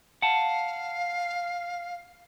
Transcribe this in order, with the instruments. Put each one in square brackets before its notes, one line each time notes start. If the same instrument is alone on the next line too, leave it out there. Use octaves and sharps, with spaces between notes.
[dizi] F5 [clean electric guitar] F#5 A5